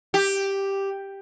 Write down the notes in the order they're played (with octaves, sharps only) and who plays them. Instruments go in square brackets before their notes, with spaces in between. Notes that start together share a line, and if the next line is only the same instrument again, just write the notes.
[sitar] G4